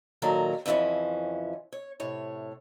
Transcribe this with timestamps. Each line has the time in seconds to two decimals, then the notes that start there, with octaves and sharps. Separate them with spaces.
0.22 A#2 D#3 F#3 A4 A#4
0.66 F2 C#3 E3 F3 C#4
1.73 C#5
2.00 A2 C3 C#5